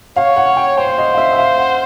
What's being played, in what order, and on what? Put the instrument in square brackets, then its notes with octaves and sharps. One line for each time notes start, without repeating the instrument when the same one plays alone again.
[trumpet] C#5 [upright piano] F5
[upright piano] F#5
G5
[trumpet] C5 [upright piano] G5
[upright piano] D#5
F5
E5
E5
F5
F#5